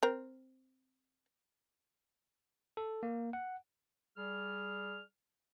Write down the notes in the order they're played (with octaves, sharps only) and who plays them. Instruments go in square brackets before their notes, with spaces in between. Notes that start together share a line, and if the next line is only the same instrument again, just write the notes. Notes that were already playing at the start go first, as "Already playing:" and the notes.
[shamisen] C4 A#4
[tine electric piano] A4
A#3
F#5
[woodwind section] G3 G#4 F6